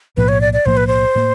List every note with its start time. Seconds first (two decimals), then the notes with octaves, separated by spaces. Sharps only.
0.17 B1 A2 F3 A#3 B4
0.28 C#5
0.41 D5
0.53 D5
0.65 B1 A2 F3 A#3 C5
0.77 B4
0.87 C5
1.15 A2 F3 A#3